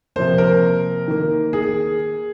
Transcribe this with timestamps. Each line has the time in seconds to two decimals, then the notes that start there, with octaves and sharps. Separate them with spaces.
0.16 C3 F3 A#3 C5
0.38 A#4
1.08 D#3 A#3
1.53 G#4